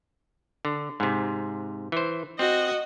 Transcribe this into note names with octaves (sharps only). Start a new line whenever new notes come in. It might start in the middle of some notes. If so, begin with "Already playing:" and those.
D3
G#2 C3
E3 C5
C4 F#4 D#5